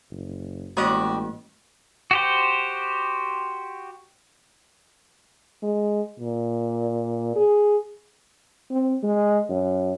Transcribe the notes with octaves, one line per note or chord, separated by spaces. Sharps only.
F#1
A1 G#3 A#3 F#4 G4 D5 D#6
F#4 G4 C5
G#3
A#2
G#4
C4
G#3
F#2